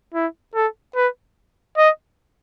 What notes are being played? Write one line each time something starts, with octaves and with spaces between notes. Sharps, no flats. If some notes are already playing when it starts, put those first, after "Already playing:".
E4
A4
B4
D#5